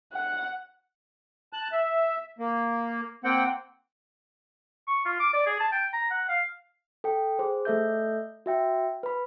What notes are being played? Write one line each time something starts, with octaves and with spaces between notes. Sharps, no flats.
F#5
A5 F#6
E5
A#3
A#3 C4 F#5 G5
C#6
F4
D6
D5
G#4
A5
G5
A#5
F#5
F5
A4 G5
G#4 C5
A3 A4 E5 G6
F#4 E5 G5
B4 B5